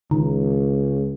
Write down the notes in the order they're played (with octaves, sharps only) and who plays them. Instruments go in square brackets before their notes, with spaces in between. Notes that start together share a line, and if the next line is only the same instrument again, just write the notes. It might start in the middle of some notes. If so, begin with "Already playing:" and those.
[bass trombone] C#2 [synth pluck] D#3